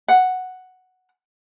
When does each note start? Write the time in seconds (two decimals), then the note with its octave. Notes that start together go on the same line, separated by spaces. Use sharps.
0.08 F#5